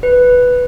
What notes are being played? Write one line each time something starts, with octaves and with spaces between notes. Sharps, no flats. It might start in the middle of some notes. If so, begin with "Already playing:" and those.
B4